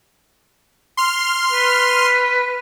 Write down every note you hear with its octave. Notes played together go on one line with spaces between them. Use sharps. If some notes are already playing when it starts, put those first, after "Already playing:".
C6 F6
B4